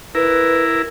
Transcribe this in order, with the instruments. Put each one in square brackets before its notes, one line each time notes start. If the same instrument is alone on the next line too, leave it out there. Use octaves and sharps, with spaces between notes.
[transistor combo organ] E4 A#4 [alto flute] B4